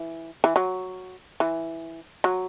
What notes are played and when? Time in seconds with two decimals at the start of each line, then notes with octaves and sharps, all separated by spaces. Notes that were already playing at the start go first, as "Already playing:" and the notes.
Already playing: E3
0.44 E3
0.56 F#3
1.40 E3
2.24 F#3